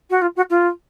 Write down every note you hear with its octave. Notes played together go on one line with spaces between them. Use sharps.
F#4
F4
F#4
F4